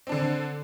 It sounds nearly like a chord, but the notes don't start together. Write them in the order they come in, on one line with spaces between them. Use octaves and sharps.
C4 D4 D3